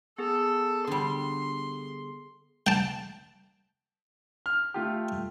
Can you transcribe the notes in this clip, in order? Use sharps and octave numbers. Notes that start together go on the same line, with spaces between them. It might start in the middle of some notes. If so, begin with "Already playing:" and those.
B3 G#4 A4
D3 G3 C6
G5 A5
F6
A3 F4 G4